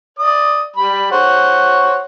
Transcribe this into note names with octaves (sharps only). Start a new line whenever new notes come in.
D5 D#6
G3 B5
C5 C#5 F#5